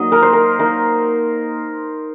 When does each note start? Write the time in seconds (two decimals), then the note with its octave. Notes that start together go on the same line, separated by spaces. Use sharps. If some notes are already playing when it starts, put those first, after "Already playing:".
Already playing: F#3 A#3 D#4 D#5
0.12 A#4
0.22 C5
0.33 A#4
0.59 A#3 D#4 A#4